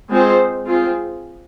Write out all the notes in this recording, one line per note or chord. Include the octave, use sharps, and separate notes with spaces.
G#3 C4 F4 G#4 C5
C4 F4 G#4